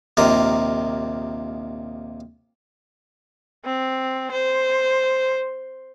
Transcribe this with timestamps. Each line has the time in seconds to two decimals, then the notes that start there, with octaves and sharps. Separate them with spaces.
0.17 A#1 D#2 C3 A#4
3.65 C4
4.32 C5